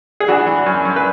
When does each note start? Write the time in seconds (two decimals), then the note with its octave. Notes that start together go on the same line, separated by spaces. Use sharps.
0.20 G#4
0.28 E3 D4 F#4
0.47 E3
0.66 F#2
0.85 F#2
0.96 B4